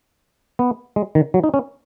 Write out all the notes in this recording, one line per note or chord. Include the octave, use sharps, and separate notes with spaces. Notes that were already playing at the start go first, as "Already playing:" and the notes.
B3
G#3
D#3
F#3
D#4
C#4